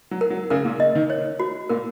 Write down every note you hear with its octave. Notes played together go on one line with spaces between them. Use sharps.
F#3
A#4
F#3
C#3 A#4
A#2
D#5
D#3
C#5
F#4
A#2 A#4